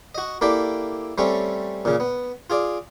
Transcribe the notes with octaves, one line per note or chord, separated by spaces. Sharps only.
F#4 D#5
A#3 E4 G4 A4 D5 E5
G3 A3 C4 C#4
A#2 C#3
B3
F4 G#4 D5